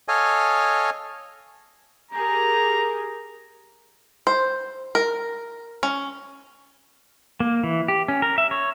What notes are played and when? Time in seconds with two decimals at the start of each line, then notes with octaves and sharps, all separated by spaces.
0.08 A4 C#5 D#5 F5 G#5
2.11 G4 G#4 A#4 A#5
4.27 C5
4.95 A#4
5.83 C#4
7.40 A#3
7.64 E3
7.88 G4
8.08 C#4
8.22 A#4
8.38 E5
8.51 C#5